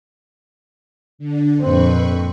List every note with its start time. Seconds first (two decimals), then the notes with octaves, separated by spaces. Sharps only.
1.19 D3 D4
1.61 F2 A#2 C4 B4 B5 C#6